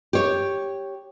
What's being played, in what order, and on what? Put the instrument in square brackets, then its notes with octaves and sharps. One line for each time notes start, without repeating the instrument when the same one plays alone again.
[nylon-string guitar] G4 C#5